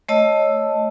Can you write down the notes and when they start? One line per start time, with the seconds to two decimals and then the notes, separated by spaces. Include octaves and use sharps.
0.09 A3 C#5 D#5 A5 E6